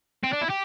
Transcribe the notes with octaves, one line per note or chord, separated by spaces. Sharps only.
C4
D4
E4
G4